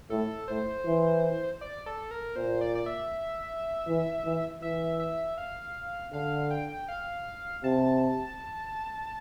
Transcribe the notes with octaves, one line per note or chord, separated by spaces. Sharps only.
A2 A4
A2 C5
E3
D5
A4
A#4
A#2 C5
D5
D5
E5
E3
E3
E3 E5
E5
F5
D3 F5
G5
F5
C3 A5